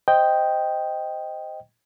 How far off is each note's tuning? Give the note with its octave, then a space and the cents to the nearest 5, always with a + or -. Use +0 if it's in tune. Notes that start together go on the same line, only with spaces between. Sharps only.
C5 +0 D#5 +0 G5 +0